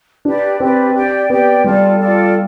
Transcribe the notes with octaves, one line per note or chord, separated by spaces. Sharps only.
D4 G4 B4 D5
C4 G4 B4 D5
G4 D5 G5
B3 G4 D5 G5
G3 F4 A4 D5
F4 A4 D5